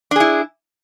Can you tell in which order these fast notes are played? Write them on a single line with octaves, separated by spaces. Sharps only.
D4 G#4 E4